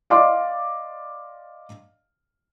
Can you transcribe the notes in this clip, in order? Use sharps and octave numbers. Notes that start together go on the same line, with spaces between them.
D5 D#5 F5 C6 D6